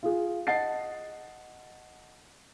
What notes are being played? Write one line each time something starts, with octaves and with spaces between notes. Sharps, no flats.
F4 G#4
D#5 F#5 A5 A6 C7